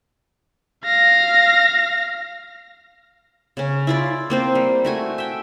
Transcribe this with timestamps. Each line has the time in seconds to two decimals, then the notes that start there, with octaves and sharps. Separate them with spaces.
0.84 F5 A#6
3.57 C#3 C#4
3.87 E4 F4 D5
4.30 A#3 C4 C5
4.55 G3
4.85 A3 F#4 G#5
5.18 E5 G5